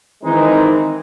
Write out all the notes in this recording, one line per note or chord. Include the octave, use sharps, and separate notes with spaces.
D#3 E3 G#3 C4 D#4